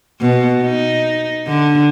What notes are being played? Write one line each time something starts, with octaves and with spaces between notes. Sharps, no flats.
B2
D#4
D3